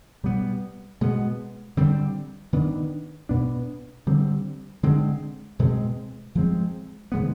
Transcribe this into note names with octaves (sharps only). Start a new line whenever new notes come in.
B2 G3 B3
B2 G#3 B3
D3 G3 C4
D#3 B3 D4
B2 B3 D4
D3 G3 C4
D3 G#3 C4
B2 G#3 C4
F3 G#3 C4
C3 D#3 G#3 B3